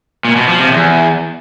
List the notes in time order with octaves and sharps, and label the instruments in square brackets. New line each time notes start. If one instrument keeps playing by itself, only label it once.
[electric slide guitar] A#2
B2
F3
C3
E2